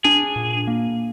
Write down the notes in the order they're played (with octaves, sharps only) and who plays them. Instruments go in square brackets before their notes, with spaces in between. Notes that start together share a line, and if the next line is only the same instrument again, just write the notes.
[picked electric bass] D4 [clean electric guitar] G#4
[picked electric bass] A#2
A#3